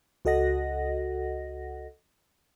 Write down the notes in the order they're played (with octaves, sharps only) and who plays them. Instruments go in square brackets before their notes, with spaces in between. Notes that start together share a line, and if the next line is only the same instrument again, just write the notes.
[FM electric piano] C#2 F#4 A4 D#5 F#5 A#6